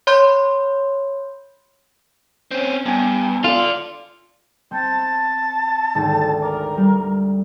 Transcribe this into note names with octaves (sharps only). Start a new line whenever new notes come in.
C#5 B5 C6 G6
C4 C#4
G2 B3 G#5
F4 A4 D5
C4 A5 G6
G#1 D2
A#4 D6
G3